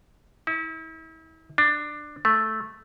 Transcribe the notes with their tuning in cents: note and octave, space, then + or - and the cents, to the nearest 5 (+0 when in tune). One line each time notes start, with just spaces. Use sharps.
E4 -40
D4 +15
A3 -5